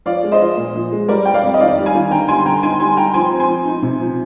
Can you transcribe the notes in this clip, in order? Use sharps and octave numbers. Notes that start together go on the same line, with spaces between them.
F3 D5 F5
G#3
C5 D#5
F3
A#2
F3
G#3
G3 A#4 D5
G3 G5
D5 F5
F2
D#5
D#3 D5 F5
G3
F5 G#5
D#3
D3 G5 A#5
G3 G#5 C6
C6
D3 G5 A#5
D#4 G#5 C6
G3 G#5 C6
D#4 G5 A#5
F3 G#5 C6
C4
G#5 C6
F3
D#4
C3
F3